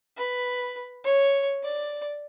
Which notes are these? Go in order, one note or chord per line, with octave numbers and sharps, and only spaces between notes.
B4
C#5
D5